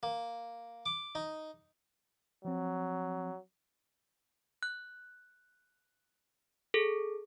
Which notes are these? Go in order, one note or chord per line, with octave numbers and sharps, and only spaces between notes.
A#3
D6
D#4
F3 F#3 C4
F#6
G#4 A4